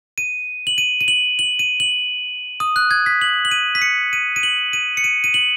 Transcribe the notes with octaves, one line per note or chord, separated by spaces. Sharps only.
D#7
F#7
D#7
D#7
F#7
F#7
D#7
F#7
D#6
F#6
G#6
B6
F#7
F#7
D#7
B6
C#7
D#7
D#7
F#7
D#7
C#7
D#7
D#7
F#7